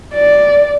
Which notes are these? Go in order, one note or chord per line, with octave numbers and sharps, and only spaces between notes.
D5